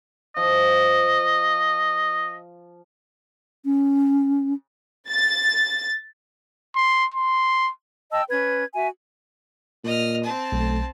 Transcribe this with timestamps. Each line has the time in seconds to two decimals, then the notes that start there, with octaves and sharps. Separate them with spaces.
0.36 F3 D#5
3.65 C#4
5.11 A6
6.75 C6
7.14 C6
8.12 D#5 G5 A5 E6
8.29 C#4 B4 G#6
8.74 F#4 E5 G#5
9.84 A#2 D#5 F6
10.23 C4 A5
10.52 B1 A3